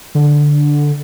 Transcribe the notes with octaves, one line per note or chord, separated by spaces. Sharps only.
D3